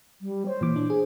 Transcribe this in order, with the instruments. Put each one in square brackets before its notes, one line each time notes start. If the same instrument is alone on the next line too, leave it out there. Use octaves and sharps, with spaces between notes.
[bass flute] G3
[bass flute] C5 [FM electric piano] C#5
[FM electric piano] A#2 E3 D6
D4
G#4